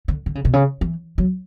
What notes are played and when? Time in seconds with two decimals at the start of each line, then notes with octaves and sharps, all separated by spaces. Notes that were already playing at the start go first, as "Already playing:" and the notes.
0.08 D3
0.26 D3
0.35 C#3
0.45 B2
0.53 C#3
0.81 E3
1.18 F#3